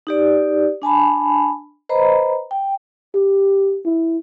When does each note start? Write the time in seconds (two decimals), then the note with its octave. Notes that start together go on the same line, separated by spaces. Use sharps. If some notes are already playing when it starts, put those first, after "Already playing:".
0.07 D#4 G4 D5
0.82 D4 G#5 A5 B5
1.89 B4 C5 D#5 A#5 B5
2.51 G5
3.15 G4
3.85 E4